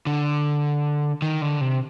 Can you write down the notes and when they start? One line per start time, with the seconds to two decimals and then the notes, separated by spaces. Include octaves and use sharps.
0.07 D3
1.22 D#3
1.42 D3
1.61 C3